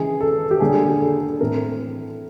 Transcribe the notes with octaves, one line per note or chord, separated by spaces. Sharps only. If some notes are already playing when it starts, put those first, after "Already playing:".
Already playing: C#3 E3 G#3 G#4
A4
G4
D3 G3 A#3 G#4
G#4
A4
A4
A2 E3 A3 C4 A#4